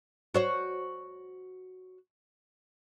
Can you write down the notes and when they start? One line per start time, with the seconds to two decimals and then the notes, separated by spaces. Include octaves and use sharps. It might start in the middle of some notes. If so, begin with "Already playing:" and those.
0.34 F#4 C5 C#5